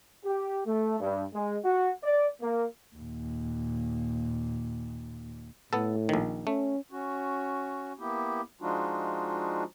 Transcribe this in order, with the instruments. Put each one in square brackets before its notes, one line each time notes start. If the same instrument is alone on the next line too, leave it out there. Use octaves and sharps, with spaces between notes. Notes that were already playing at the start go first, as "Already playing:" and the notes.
[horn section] G4
A3
G2
G#3
F#4
D5
A#3
[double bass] D#2 A#2
[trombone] A2 [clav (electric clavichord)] B3 A4
[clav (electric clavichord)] A#1 D#3
[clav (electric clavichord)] A3 [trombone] C#4
[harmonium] C#4 F#4
A#3 B3 E4 G4
F3 G#3 D4 D#4 F4 F#4